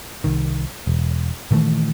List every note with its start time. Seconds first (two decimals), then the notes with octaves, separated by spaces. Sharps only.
0.24 C2 D#3
0.87 E1
1.51 A#2 D#3 E3 A3